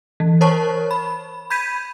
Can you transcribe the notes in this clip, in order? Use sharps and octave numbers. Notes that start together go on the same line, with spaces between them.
E3
A#4 C5 C#5 A5 C#6
B5
B5 G6 G#6 B6 D#7